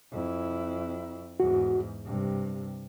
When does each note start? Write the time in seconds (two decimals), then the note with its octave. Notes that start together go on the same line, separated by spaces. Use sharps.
0.12 F2 E4
1.40 E2 G#2 F#4
2.05 C2 G2 C3